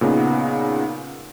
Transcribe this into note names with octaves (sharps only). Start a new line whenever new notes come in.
A#2 C#3 B3 D#4 F#5